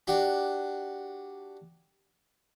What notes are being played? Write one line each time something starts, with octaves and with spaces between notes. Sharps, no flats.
D4 F#4 G4